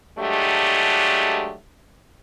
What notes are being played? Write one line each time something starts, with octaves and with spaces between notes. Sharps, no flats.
F#3 G#3 A3 D4 G4